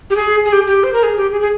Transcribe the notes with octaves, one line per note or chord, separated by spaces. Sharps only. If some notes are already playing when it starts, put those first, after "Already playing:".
G4
G#4
G#4
G4
G4
C5
A#4
G#4
G4
G#4
G#4